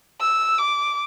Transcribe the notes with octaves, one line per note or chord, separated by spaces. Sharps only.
E6
D6